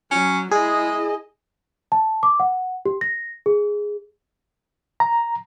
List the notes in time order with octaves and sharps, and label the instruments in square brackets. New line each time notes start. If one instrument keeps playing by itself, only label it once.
[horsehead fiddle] F#3 [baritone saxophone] C#4
[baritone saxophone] G#3 [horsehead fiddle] E4 D#5 [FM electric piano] G#4
[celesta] A5
D6
F#5
G4
A#6
G#4
[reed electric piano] A#5